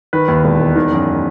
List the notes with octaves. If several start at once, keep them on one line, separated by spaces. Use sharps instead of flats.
D#3 B4
D#2
E1
E1
D#3
F#2